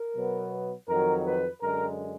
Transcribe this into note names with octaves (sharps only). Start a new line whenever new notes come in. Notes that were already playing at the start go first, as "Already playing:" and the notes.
Already playing: A#4
B2 F#3 B3
F2 D#3 F#3 A#4
B4
F#2 D3 G#3 A#4